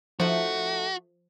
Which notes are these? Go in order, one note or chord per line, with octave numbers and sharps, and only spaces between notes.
F3 A3 D#4 F#4